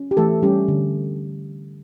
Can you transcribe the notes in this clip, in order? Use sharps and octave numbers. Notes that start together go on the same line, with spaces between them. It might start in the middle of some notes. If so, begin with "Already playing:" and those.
Already playing: C#4
G4
E3 A3 A4
G3 C#4 G4
D3